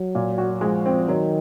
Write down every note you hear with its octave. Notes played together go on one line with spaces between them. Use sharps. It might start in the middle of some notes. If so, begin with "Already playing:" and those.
Already playing: F#3
A#2
F#4
F3 G#3
C4
D#3 F#3